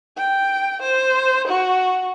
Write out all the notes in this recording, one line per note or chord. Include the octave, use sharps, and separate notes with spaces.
G5
C5
F#4